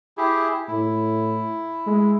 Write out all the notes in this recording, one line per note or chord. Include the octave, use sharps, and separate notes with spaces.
E4 G4 G#4
A2 E4
G#3